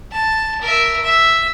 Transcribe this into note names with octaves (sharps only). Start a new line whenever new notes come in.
A5
A#4 E5
E5